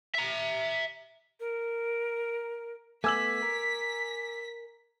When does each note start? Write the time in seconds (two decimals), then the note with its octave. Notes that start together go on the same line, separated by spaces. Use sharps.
0.15 E5 A#5
1.40 A#4
3.04 A3 B3 G#5 D6 E6 G#6 B6 F#7
3.42 A#4